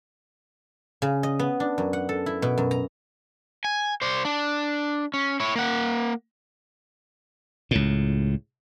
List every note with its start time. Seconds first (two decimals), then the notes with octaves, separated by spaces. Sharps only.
1.02 C#3
1.23 D#5
1.39 B3
1.60 D4
1.78 F#2
1.93 F#5
2.09 A4
2.26 E4
2.42 B2
2.58 F#2
2.71 A#5
3.65 G#5
4.02 C5 D5
4.25 D4
5.14 C#4
5.40 E4 C#5
5.56 A#3 F#5
7.71 C#2 A2